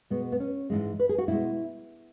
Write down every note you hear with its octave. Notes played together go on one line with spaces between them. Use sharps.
B2 G#3 B3
B3
C#4
G#2 E3 G#3
B4
G#4
F#4
B2 G#3 E4